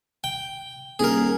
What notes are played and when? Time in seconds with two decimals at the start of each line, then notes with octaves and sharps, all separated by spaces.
0.24 G5
0.99 D#1 G#4 A#4